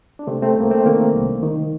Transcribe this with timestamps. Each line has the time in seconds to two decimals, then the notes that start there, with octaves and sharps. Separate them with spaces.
0.19 D4
0.27 C3 A3 C4
0.42 A3 C4
0.56 C2 A#3
0.70 A3 C4
0.85 D#3 A#3 D4
1.14 C2
1.43 D#3